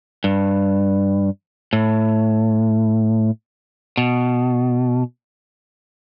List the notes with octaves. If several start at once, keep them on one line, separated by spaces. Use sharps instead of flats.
G2
A2
B2